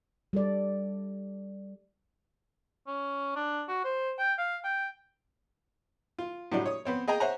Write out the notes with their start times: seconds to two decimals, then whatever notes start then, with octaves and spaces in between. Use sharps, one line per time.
0.33 G3 A4 D5
2.87 C#4
3.36 D4
3.69 F#4
3.85 C5
4.19 G5
4.39 F5
4.64 G5
6.18 F4
6.52 A2 F#3 G3 D4
6.66 C#5 D#6
6.85 B3 C4 C#5
7.08 G#4 D#5 G5 G#5 A#5
7.20 C5 C#5 E5 F#5 G#5 A#5